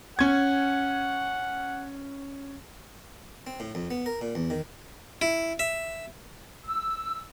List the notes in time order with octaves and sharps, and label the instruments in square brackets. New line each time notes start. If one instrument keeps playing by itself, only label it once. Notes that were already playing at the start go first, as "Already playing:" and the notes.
[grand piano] C#4 G#6 [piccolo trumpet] F#5
[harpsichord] C4
A2
F2
B3
A#4
A#2
E2
D#3
E4
E5
[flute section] E6